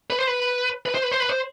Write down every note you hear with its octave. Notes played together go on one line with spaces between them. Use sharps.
B4
C5
B4
B4
C5
B4
C5
B4
C5